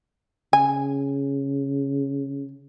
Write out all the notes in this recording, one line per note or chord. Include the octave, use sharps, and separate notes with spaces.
C#3 G#5